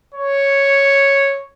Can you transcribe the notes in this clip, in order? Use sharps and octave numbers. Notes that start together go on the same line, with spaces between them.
C#5